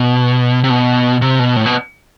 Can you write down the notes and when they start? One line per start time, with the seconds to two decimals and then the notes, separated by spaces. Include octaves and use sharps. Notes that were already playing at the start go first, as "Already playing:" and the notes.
Already playing: B2
0.64 C3
0.70 B2
1.22 C3
1.39 B2
1.56 A2
1.66 B2